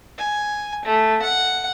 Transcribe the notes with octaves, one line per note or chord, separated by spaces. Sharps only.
G#5
A3
F#5